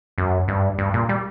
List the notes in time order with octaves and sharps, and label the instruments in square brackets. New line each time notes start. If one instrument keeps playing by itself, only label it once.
[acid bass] F#2
G2
G2
A#2
G3